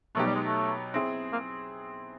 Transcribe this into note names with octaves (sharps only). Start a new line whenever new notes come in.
B2 F#3 A3 B3 D#4 G4
G3
G#3
A3
C4 E4 G#4
A#3